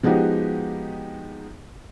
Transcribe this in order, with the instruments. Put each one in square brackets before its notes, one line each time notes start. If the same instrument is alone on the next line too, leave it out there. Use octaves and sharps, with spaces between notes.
[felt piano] F3 G#3 B3 D#4 F#4 G4